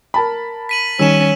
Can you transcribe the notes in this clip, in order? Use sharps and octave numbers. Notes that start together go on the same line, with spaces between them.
A#4 A5 B5
B6 D#7 F#7
D#3 G3 C#4 E6 E7